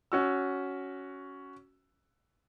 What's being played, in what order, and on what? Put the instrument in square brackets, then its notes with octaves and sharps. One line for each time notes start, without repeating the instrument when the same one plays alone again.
[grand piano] C#4 F#4 E6